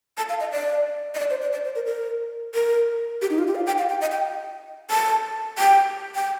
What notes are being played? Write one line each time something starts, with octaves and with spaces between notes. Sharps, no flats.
A5
F5
D#5
D5
D#5
D5
C5
D5
D5
C5
A#4
A#4
A#4
G4
D#4
F4
G4
F5
G5
F5
G5
D#5
G5
A5
G5
G5